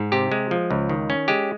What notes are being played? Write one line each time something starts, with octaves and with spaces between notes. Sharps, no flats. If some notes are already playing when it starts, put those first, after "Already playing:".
Already playing: G#2
C3 G4
G#3
F3
C#2
D#3
C#4
G#3 G4